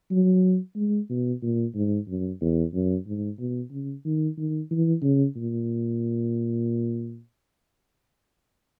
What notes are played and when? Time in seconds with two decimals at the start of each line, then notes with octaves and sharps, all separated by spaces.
0.11 F#3
0.76 G#3
1.10 B2
1.42 A#2
1.75 G#2
2.08 F#2
2.41 E2
2.73 F#2
3.07 G#2
3.39 B2
3.71 C#3
4.05 D#3
4.38 D#3
4.71 E3
5.03 C#3
5.36 A#2